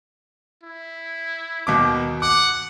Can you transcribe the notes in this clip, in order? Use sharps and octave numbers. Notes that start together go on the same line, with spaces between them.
E4
D#2 B2 D6
F#5 D6